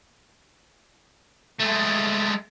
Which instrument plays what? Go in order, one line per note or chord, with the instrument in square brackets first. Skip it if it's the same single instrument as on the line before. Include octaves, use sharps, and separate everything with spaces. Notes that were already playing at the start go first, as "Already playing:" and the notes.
[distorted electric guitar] G#3 A3